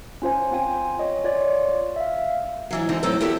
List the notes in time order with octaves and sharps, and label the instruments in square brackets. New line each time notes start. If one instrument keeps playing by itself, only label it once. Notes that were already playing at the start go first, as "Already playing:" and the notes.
[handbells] C#4 F4 C5 G#5
C4 F4 G5 G#5
C#5 D#5
F4 C#5 D5
E5 F5
[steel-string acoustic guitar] G#2 E3 F#3
D3 E3 C4 D#4
A2 F#3 G#3 C4 A4 B4
E2 F#4 G4 A4 E5